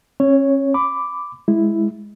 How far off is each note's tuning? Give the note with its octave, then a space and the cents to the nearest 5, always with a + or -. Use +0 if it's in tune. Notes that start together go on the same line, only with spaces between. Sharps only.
C#4 -35 C#5 +0
B5 +20 D6 +0
G#3 +0 E4 +0